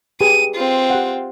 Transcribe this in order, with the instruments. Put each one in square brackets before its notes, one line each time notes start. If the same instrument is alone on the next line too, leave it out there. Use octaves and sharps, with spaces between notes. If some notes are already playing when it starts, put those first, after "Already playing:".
[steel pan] G4 G#4 B4 [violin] D#7
[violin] C4 F4
[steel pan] G4 F#5